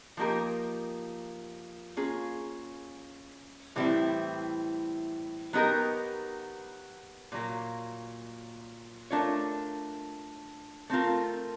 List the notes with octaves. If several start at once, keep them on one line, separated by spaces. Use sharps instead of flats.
F3 A#3 D#4 G4 A#4
A#3 C#4 F4 G#4
A2 E3 G3 C4 E4
F#3 B3 D#4 G4 A#4
A#2 F#3 A#3
A3 D4 F4 A#4 C#5
A3 C4 F4 A#4